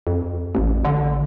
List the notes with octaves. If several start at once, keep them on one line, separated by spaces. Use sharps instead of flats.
F2
A1
D3